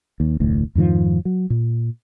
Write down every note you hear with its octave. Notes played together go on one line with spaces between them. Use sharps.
D#2
F1 D2 A2
F2 G#2 D#3 F3
F#3
A#2